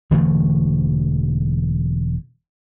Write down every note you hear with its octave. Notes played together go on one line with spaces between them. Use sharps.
E1 D3 E3 A3